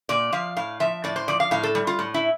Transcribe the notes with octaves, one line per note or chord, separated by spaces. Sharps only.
A#2 D5
F3 F5
A2 F5
F3 E5
A2 D5
C5
F3 D5
F5
A2 F5
A4
G3
F4
A2
E4